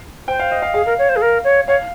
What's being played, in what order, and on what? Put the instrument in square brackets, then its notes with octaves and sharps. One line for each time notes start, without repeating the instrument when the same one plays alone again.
[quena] C5 [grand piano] G5
[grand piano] F5
D#5
F5
[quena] G#4 [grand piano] F5
[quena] A#4
C#5
C5
G#4
A#4
C#5
[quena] C#5 [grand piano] F5